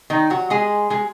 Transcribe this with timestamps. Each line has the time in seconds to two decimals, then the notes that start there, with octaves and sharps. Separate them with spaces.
0.10 D#3 D#4
0.30 F#3 F#4
0.50 G#3 G#4
0.90 G#3 G#4